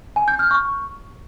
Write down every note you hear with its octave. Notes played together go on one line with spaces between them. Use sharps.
G#5
G6
F6
C#6